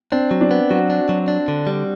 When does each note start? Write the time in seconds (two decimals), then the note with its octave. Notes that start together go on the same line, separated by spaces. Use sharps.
0.12 C4 D4
0.31 F#3
0.41 D4
0.51 B3
0.70 F#3 F#4
0.90 D4
1.09 F#3
1.28 D4
1.48 D3
1.67 G3